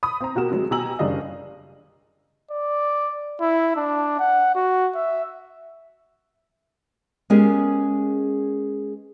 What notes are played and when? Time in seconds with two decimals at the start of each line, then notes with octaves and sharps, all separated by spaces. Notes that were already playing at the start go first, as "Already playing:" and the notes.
0.03 B5 D#6
0.21 C4 A#5
0.36 B2 F#4 G4 A#4 E7
0.51 C3 F#3 G#3
0.71 B2 G4 G#5 A#5 E6 F#7
0.99 F#1 G3 D4 D#5 F5
2.51 D5
3.41 E4
3.76 D4
4.19 F#5
4.55 F#4
4.95 E5
7.30 G#3 B3 C#4 G4 G#4 A#4